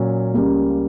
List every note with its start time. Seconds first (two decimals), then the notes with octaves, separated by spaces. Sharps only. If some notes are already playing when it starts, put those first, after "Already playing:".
Already playing: A#2 F#3 C#4
0.34 C#2 C#3 G3 A#3